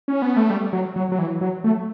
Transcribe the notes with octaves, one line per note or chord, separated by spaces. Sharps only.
C#4
B3
A3
G3
F#3
F#3
F#3
E3
F#3
A3